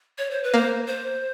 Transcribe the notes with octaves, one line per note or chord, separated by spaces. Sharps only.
C#5
C5
B4
A#3 C5
C5